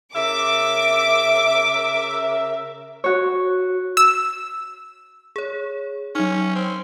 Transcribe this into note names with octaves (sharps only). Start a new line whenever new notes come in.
C#3 A#4 E5 D6
F#4 C#5
E6
G#4 C#5
F#3 C#4 D#4 F6
C4